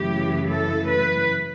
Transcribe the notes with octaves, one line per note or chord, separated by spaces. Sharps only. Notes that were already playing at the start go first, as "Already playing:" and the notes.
Already playing: F#2 C#3 E3 A3 E4 G4
A4
B4